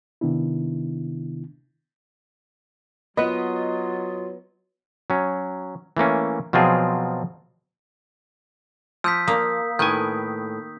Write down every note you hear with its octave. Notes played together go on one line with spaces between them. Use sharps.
C3 D#3 B3 D4 E4
F#3 B3 F4 B4 D#5
F#3 C#4
E3 A3 A#3 C#4
B2 F3 F#3 C4 F4 G#4
F3 E6 G6 B6
A#3 D#6
A2 D#3 B4 G#5 G6